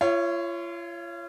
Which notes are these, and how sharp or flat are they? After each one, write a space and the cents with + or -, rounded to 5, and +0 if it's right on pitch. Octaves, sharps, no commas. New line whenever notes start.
F4 -35 C#5 +0 E5 +15